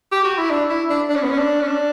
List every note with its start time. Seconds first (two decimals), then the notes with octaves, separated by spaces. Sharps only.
0.12 G4
0.24 F#4
0.38 E4
0.50 D4
0.70 E4
0.90 D4
1.09 D4
1.16 C#4
1.23 B3
1.30 C#4
1.39 D4
1.62 C#4
1.68 D4